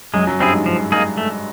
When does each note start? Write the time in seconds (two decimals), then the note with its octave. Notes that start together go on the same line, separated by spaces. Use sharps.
0.14 F#2 F#3 G#3
0.27 F#2 F#3
0.40 G2 G3 C4 E4 G#4
0.53 G#2 G#3
0.66 F3
0.92 A#3 D#4 G#4
1.18 A3